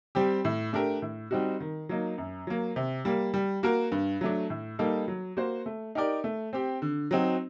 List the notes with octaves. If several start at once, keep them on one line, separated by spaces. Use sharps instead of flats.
G3 C4 G4
A2
A3 D4 G4 A#4
A2
G3 C4 D#4 F#4
D#3
F#3 A#3 D#4
F#2
F#3 A#3
C3
G3 A#3
G3
A#3 F#4 A#4
G2
F#3 A3 D4
A2
G3 A#3 D#4 A4
F#3
A#3 F#4 C5
A3
D#4 G4 A#4 D5
A3
C4 G4
D3
F#3 C4 D#4 F#4